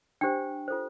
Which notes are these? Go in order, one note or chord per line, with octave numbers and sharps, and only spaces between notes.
D4 G4 C5 G5
F4 A4 C5